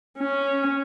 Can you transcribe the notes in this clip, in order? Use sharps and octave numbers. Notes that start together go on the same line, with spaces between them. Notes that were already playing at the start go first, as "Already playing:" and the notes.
C#4